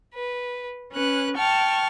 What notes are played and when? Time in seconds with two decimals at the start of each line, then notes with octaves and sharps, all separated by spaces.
0.14 B4
0.91 C#4 B4 F#6
1.37 G5 A5 C#6 F6